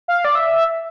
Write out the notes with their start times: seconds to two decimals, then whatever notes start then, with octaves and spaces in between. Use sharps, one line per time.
0.08 F5
0.25 D5
0.35 E5